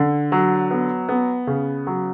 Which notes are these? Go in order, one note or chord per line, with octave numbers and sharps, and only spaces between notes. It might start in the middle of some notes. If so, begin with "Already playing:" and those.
Already playing: D3
F#3
B3
B3
C#3
F#3